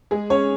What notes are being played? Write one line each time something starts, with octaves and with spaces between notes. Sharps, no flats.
G#3 G#4
C#4 C#5